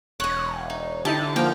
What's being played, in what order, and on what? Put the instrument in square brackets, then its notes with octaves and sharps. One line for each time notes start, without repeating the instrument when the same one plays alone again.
[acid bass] E1 [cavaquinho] C#5 D#5 [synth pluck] F#6
[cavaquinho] D#4
[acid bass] D3 [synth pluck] D#4 E4 G4 [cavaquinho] A5
[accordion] F3 [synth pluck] A#3 F6 [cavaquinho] G5